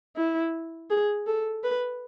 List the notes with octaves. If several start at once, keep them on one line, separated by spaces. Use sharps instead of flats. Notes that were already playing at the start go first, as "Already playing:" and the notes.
E4
G#4
A4
B4